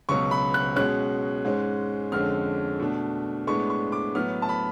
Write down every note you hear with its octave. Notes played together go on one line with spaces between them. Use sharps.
C#2 B2 F#3 C#6
B5
F#6
B2 G#3 C#4 F#6
G#2 G#3 C#4
F2 D3 G#3 C#4 F6
B2 A3 D4
A2 G#3 B3 D4 C#6
C#6
D6
A2 F#3 B3 F6
A5
B5